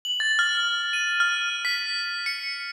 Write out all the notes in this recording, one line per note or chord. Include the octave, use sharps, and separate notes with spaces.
F#7
A6
F6
D#7
F6
B6
C#7